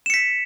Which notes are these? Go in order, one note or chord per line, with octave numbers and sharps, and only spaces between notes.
B6 C#7 E7